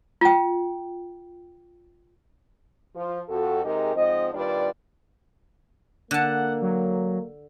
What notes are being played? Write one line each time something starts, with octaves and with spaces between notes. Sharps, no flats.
F4 G5
F3 F4
F2 F#4 A4
C3 G#3 D#4 G4 G#4 A#4
G#2 F3 C4 D#5
D#2 G3 D4 F4 B4 D5
D3 A#3 F#5 A5
F#3